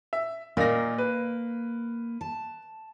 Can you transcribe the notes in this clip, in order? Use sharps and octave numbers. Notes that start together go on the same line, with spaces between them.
E5
A#2 A#3 D#4 A#6
B4
A5